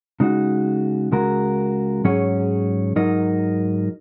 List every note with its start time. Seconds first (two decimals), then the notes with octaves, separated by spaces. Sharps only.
0.20 C#3 G#3 D#4 F#4
1.12 C#2 C#3 G#3 F#4 A#4
2.04 G#2 F#3 C#4 G#4 C#5
2.96 G#2 F#3 D#4 A#4 D#5